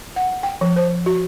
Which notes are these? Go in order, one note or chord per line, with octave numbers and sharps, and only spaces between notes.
F#5
G5
F3
C5
F#4